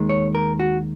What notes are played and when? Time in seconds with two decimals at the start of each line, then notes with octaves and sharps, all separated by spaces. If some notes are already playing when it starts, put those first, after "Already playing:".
Already playing: D#2 D#3 G#3
0.09 C#5
0.35 A#4
0.60 F#4